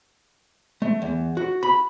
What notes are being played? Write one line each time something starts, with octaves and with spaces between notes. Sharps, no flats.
A3
E2
F#4
B5